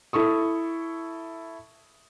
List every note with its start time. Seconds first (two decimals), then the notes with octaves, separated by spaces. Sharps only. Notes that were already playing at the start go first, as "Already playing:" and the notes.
0.13 E4 A4 C#6 D#6